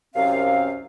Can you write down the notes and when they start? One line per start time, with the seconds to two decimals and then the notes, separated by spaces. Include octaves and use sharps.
0.14 C2 F#2 C3 C4 F5